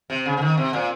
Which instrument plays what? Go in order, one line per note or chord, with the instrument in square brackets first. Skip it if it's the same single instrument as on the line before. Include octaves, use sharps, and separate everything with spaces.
[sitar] C3
C#3
C#3
D#3
C3
A#2